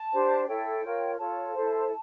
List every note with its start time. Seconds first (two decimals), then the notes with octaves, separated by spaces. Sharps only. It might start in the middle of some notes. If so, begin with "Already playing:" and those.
Already playing: A5
0.12 D4 G4 C5
0.48 E4 A4 C#5 G5
0.83 F4 A#4 C#5
1.18 F4 A4 C#5 A5
1.54 E4 A4 C5